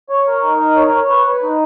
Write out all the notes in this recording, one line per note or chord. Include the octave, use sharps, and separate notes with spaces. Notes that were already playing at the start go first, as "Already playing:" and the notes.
C#5
A#4
D#4
A#4
C#5
C#5
B4
B4
D#4